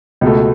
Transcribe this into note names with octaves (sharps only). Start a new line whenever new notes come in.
C#2 B2 A3